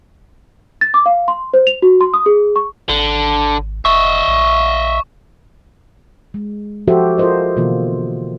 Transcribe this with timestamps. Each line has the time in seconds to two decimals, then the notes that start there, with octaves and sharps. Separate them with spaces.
0.81 A6
0.94 D6
1.06 F5
1.28 C6
1.54 C5
1.67 F7
1.82 F#4
2.01 C6
2.14 D#6
2.26 G#4
2.56 C#6
2.89 G#1 D3
3.85 F1 D#5 E5 C#6
4.28 A#1
6.34 G#3
6.88 F3 F#4 G4 A4 C5 E5
7.18 F4 A4 A#4 C5 D#5
7.56 B2 D3 E3 A#3 F4